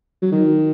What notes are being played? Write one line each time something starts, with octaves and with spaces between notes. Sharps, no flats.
F#3
D#3